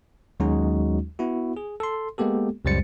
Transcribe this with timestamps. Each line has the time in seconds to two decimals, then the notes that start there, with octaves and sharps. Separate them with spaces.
0.40 D#2 F#3 G#3 C#4 D#4 F#4
1.19 B3 E4 F#4
1.57 G#4
1.80 A4 C6
2.18 G#3 A#3 B3 G4 A4
2.65 C#2 F#2 G3 C5 A6 C#7